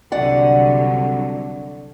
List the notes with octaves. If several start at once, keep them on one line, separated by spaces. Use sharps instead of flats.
C2 D3 F#3 D5 F#5